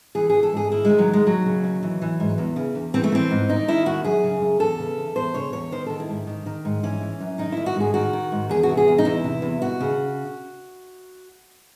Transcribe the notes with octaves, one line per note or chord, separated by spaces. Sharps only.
E3 G#4
E3 G#4
A4
G#2 G#4
D#3 E4
D#3 G#3
F#3
D#2
G#3
D#2 F#3
C#3
D#2
E3
E3
G#2
E2
C#3
E2
E3 C4
A3
E3 C4
G#2
D#3 D#4
D#3 E4
D#2 F#4
F#2 G#4
C#3
F#2
E2 A4
C#3
E2
E2 C5
C#3 C#5
E2 C#5
D#3 C5
D#3 A4
E4
G#2
D#3
D#3
G#2
E3 C#4
E3
F#2
D#3 D#4
D#3 E4
F#4
G#2 G#4
D#3 F#4
D#3
G#2
E2 G#4
F#4
C3
G#4
E2
D#4
E2 E4
C3
E2
D#2 F#4
C#3